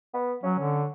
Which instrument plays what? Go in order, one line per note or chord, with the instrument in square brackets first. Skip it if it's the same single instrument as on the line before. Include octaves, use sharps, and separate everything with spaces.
[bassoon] B3
[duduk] F#3 [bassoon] C#4
[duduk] D3